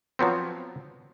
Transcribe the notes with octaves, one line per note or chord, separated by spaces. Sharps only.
F3 F#3 B3 C4